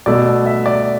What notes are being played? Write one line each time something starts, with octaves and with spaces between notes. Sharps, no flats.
B2 A3 D5
E5
D5